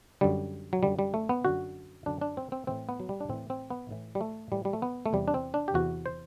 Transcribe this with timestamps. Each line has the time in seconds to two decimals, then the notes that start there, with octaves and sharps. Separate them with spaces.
0.21 F#2 D3 G3
0.73 F#3
0.83 F#2 D3 G3
0.99 G3
1.14 A3
1.29 B3
1.45 F#2 D3 F#4
2.06 F#2 D3 D4
2.21 D4
2.37 C4
2.52 C4
2.67 A2 E3 C4
2.89 B3
3.00 F#3
3.09 G3
3.21 D4
3.29 A2 E3 C4
3.50 C4
3.70 B3
3.91 A2 E3
4.15 G3
4.21 A3
4.52 A2 E3 G3
4.65 G3
4.73 A3
4.82 B3
5.06 A3
5.13 E2 C3 E3 G3
5.28 D4
5.34 C4
5.54 D4
5.68 G4
5.74 E2 C3 E3 F#4
6.06 C5